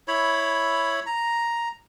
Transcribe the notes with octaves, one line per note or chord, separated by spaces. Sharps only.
E4 C#5 B5
A#5